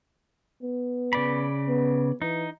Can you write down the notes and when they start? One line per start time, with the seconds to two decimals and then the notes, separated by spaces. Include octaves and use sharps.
0.62 B3
1.13 C#3 D5 B5
1.68 B3
2.22 E3 D#4